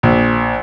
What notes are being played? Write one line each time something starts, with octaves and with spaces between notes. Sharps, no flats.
A#1